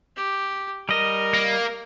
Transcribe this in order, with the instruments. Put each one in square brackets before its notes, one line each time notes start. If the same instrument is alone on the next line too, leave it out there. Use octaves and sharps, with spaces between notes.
[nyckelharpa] G4
[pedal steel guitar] G3 D#5 [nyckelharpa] A#4
[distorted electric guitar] A#3